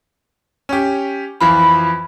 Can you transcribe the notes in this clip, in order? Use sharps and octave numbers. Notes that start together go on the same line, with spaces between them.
C#4 G4
F2 E3 F4 B5